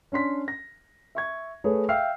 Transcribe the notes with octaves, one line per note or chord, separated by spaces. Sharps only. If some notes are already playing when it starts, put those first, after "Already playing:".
C#4 D4 C6 B6
A#6
E5 C#6 G#6
A3 G#4 A4 B4 C#5
E5 F5 G5 E6 F6 C7